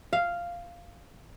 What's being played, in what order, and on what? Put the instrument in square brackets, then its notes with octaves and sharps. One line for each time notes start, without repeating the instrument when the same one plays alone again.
[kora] F5